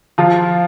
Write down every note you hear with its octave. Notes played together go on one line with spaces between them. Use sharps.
F3 F4